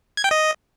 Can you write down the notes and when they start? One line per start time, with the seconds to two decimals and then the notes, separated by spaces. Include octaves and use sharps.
0.17 G#6
0.24 G5
0.31 D#5